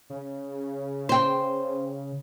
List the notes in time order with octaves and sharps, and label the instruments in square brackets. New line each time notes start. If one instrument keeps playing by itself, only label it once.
[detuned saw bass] C#3
[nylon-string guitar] C5 G5